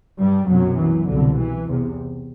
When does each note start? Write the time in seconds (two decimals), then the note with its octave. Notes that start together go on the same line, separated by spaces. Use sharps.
0.19 G2 G3
0.48 C2 F#2 B2 F#3
0.78 E3
1.08 C2 B2 D3
1.38 E3
1.67 E2 C3